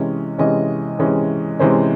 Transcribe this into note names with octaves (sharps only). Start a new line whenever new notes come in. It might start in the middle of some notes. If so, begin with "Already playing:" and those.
Already playing: C3 E3 G#3 C#4 D#5
C3 E3 G#3 C#4 D#5
C3 E3 G#3 C#4
C3 E3 G#3 C#4 C5